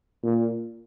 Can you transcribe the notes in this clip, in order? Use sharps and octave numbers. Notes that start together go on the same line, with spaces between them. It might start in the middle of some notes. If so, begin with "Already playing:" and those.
A#2